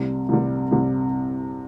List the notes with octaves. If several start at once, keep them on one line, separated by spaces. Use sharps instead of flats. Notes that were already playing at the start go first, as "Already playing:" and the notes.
Already playing: C2 C3 G3
C2 C3 G3
C2 C3 G3